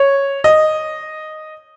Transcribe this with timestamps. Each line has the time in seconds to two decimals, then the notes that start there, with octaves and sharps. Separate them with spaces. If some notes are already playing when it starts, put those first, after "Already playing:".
Already playing: C#5
0.44 D#5